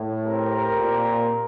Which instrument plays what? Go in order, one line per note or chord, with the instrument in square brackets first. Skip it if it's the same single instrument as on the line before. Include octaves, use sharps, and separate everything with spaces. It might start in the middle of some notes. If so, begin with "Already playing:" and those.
Already playing: [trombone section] A2
[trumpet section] C4 G4 A#4
[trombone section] A#2